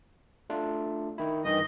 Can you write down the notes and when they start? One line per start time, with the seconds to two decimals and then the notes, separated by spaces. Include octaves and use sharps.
0.50 A3 D4 F4
1.18 D#3 E4
1.45 G2 D#3 E3 D#5